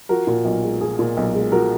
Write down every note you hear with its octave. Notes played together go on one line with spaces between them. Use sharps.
F3 F#4 A#4
A#2
B1
G#3
F3 G#4
A#2
B1
G#3
F3 F#4 A#4